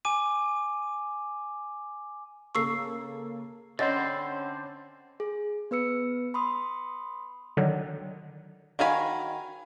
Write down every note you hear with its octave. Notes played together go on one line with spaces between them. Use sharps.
G#5 D6 D#7
C#3 A#3 A4 C#6 E6 C7
D3 C4 C#4 C5 D#5 F#5 B5 A6
G#4
B3 B4 E6 C#7
B5 C6 D#6
D3 D#3 F#3
D#3 F#4 F5 G#5 B5